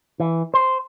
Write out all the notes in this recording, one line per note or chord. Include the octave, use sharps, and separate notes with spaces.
E3
C5